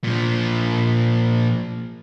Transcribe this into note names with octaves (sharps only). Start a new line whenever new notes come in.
A#2 F3